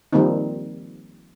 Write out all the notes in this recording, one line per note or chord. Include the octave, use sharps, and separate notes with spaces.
D#3 F3 G3 A#3 C4 D#4